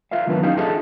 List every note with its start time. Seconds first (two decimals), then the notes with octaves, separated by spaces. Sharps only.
0.11 F4 A#4 E5 F5
0.27 D#3 F#3 B3 D4 F4 B4
0.43 C#4 D#4 G4 F5
0.57 D4 F4 G#4 A4 D#5 E5